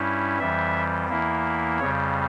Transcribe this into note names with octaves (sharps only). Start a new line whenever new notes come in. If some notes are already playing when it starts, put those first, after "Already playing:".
Already playing: G2 G3 C#4 E4
F2 E3 G3 E5
E2 E3 A#3 E4
F2 C#3 G3 C#5